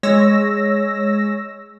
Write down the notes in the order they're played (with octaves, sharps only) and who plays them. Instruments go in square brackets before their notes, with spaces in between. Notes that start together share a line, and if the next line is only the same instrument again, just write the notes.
[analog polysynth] G#3 C#5 E6 A#6